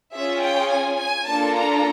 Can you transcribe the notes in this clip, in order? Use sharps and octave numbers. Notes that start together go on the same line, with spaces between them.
C#4 F4 G#4 E5
G5
G#5
G#5
A#3 D4 F4 A4 A5
A#5